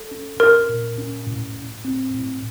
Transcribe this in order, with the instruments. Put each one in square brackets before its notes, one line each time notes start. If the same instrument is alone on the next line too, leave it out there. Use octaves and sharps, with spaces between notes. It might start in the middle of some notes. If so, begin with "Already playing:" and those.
Already playing: [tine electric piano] A4
C#4
[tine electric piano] C#4 [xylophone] A#4
[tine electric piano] A#2
C#4
A2
A2
C4
A2